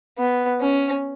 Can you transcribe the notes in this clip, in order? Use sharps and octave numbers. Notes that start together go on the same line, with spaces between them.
B3
C#4